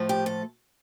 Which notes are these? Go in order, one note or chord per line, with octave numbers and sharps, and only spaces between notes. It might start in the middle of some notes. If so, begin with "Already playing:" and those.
Already playing: A2 F3 A3
G4
A4